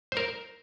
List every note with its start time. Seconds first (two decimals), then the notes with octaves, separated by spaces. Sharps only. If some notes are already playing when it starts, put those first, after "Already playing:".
0.12 C5
0.17 A#4